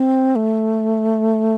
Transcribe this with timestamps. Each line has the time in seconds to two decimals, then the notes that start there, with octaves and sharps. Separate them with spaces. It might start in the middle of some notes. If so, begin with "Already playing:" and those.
Already playing: C4
0.36 A3